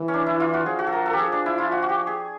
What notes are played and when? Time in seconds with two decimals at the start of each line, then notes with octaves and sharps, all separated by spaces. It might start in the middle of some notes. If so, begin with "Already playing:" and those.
Already playing: E3
0.08 C#4
0.14 D4
0.26 E4
0.40 F4
0.54 F#4
0.66 F3 G#4
0.79 F#4
0.87 A4
0.93 A#4
1.06 A4
1.13 G4
1.18 F3 G#4
1.32 D4
1.46 E4
1.58 F4
1.72 F#4
1.82 F#4
1.89 G4
2.07 G#4